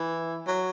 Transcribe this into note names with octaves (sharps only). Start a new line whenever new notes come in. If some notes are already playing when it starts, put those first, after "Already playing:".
Already playing: E3
F#3